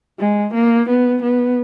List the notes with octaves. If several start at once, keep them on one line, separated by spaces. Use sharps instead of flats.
G#3
A#3
B3
B3